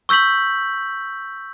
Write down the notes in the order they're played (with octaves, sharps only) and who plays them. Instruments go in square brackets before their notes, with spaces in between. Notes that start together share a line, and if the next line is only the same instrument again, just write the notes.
[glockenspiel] C#6 E6 G6 B6 F#7